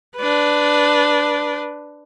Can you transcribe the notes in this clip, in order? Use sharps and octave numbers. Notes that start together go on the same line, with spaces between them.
D4 B4